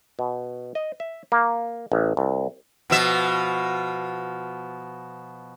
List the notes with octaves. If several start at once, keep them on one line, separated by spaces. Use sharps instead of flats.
B2
D#5
E5
A#3
A1
C2
B2 F3 E5